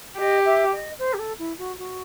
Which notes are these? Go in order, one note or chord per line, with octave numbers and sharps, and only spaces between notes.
G4 D#5
E5
D#5
C5
G4
A4
E4
F#4
F#4